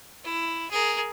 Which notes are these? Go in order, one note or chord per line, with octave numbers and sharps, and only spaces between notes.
E4
G#4 A#4